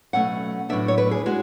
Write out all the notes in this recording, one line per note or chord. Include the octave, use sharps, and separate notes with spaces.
B2 F#3 A3 C#4 F#5
A2 F#3 B3 D4 E5
C#5
B4
G#4
G#3 F#4